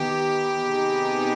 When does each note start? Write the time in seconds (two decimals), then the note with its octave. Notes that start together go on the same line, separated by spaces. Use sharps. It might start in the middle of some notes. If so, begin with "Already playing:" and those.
Already playing: D#3 B3 D#4 G4
0.64 C3 D#3 B3 D#4 G#4